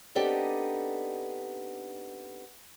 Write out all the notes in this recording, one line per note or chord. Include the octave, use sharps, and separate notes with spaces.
B3 C4 D4 D#4 G4 A4